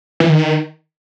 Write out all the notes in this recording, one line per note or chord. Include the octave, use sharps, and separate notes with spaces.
E3
D#3